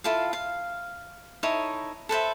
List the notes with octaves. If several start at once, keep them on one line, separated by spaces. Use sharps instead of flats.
E4 F4 A4 F5
F5
D#4 E4 A4 C#5
A4 B4 C5 E5